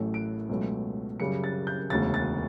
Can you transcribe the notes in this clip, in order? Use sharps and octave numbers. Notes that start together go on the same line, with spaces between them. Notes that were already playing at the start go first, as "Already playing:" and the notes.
Already playing: A1 A2 F#3 A3
D7
C#2 B2 F#3 A3
F#2 C#3 G3 C#7
A6
G6
E1 D2 C#3 A6
A6